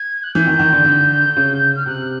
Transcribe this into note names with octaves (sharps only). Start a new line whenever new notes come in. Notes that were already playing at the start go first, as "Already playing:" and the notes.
Already playing: G#6
F#6
E3 G6
D#3
D#3
D3
D3
C#3
F6
C3 F#6